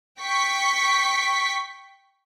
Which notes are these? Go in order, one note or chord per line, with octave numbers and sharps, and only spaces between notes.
G5 C#6 B6